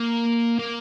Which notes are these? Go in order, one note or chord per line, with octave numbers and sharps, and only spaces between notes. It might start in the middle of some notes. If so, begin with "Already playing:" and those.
Already playing: A#3
A#3